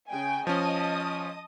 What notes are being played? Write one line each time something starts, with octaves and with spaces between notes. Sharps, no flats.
C#3 G5 G#5
F3 C#4 D#5 A5 D#6